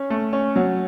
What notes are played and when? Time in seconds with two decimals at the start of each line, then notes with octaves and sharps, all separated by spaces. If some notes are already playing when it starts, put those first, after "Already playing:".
Already playing: C#4
0.10 A3
0.33 C#4
0.56 F#3